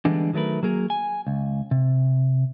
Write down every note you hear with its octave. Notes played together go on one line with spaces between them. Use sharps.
D3 E3 G3 G#3 B3 D4
D#3 F#3 A3 A#4 B4
F#3 A#3 G#4 A#4
G#5
C#2
C3